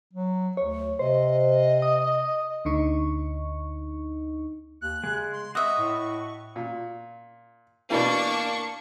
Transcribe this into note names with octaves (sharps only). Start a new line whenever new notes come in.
F#3
D2 C#5
C3 C5 D#5
D#6
D2 D3 D#4 C#6
D#2 F#6
C#3 G#3
C6
F#4 D#5 E5 C#6 D#6
A2
A#2
B2 E3 A#3 D4 C#6